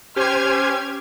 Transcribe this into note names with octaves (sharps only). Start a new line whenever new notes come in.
C#4 G4 C5 G#5 F6 G#6